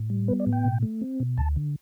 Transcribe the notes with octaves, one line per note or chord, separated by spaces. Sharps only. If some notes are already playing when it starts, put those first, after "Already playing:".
Already playing: A2
G3
B3 B4
D5
A2
G5
B2
A3
C4
B2
D2 A5
D3